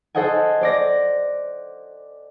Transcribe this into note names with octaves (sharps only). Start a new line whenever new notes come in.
A4 C5 D#5 F#5 G#5
C5 D5 A#6